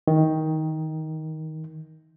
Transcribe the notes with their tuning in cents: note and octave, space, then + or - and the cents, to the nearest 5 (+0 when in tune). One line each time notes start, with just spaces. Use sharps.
D#3 +15